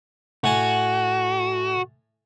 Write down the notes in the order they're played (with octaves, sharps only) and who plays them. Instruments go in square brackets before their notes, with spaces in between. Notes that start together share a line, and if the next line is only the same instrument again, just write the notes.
[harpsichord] A2 G#5 A5 [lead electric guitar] F#4